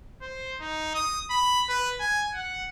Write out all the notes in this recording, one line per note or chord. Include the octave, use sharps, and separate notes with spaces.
C5
D#4
D#6
B5
B4
G#5
F#5